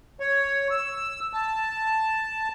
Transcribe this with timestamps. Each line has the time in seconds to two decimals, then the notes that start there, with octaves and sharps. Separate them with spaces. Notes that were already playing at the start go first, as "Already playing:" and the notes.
0.20 C#5
0.71 E6
1.33 A5